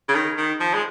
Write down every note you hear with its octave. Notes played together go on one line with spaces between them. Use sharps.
C#3
D#3
D#3
F3
G#3